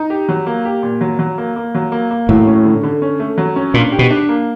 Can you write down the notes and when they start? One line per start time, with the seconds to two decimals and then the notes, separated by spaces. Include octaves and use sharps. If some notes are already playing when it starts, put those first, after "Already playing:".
Already playing: D#4
0.10 G4
0.29 F#3
0.47 A#3
0.65 G4
0.83 A#2
1.01 F#3
1.19 F#3
1.38 A#3
1.56 A#3
1.75 F#3
1.92 A#3
2.11 A#3
2.29 A2 F#3
2.47 C#4
2.65 D3
2.83 D3
3.02 C#4
3.20 A3
3.38 F#3
3.56 C#4
3.74 A#2 D4
3.92 G4
3.99 B2
4.10 D4
4.29 A#3